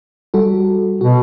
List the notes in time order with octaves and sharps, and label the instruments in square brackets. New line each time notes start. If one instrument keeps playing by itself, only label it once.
[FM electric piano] G3 F#4 A4
[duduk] B2 [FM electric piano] F#4